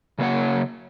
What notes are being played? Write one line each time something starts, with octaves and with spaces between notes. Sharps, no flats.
C#3 F#3 A#3 C#5 F#5